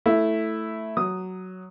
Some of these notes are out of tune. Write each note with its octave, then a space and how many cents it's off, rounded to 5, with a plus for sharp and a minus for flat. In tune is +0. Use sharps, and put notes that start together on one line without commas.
A3 +0 E4 +0
F#3 +5 D#6 +0